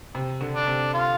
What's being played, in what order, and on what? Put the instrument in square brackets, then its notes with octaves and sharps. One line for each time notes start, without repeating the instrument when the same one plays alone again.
[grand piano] C3
D3
[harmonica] D4
[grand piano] C3
[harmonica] F4